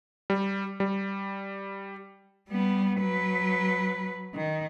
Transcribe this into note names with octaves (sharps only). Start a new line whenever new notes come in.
G3
G3
G3 B3
F#3 B4
D#3